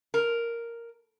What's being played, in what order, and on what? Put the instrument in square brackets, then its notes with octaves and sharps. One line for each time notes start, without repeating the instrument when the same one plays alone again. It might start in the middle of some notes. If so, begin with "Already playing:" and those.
[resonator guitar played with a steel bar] A#4